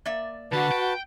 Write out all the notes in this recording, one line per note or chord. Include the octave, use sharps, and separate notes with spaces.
A#3 D5 E5
D3 F#4 B4 A5
G5